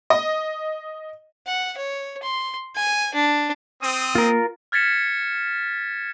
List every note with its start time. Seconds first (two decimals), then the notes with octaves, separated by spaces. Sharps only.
0.10 D#5
1.47 F#5
1.78 C#5
2.23 C6
2.76 G#5
3.15 D4
3.81 C4 D#6
4.15 A#3 F4 A#4
4.72 F6 G#6 A6 B6 C#7 E7